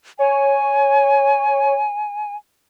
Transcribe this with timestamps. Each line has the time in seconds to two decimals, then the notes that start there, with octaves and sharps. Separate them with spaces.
0.19 C#5 G#5